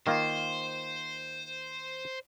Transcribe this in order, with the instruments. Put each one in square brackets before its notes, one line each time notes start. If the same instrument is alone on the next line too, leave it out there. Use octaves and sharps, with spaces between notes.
[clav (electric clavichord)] D#3 A#3 F4 [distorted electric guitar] C5